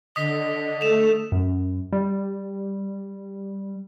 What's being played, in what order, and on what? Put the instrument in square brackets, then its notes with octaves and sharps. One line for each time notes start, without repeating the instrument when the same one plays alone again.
[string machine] D3 [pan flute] D#5 [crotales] D#6 B6
[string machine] A3 [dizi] A4 [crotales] E7 F7
[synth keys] F#2
G3